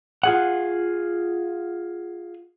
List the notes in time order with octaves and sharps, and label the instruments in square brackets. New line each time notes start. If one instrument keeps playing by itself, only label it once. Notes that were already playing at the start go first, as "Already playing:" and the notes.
[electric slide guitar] F4 G#4 F#5